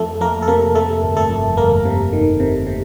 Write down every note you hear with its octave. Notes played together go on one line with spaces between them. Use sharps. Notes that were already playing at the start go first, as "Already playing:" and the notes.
Already playing: F2 A3 A4
F2 A#3 A#4
A4
C3 A#3 A#4
C3 A3 A4
G1
A3 A4
F2
G1 A#3 A#4
C3
D#3
C3
C3